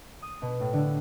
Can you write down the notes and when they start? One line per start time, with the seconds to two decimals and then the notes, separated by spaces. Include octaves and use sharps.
0.22 D#6
0.42 B2
0.60 A2
0.73 D3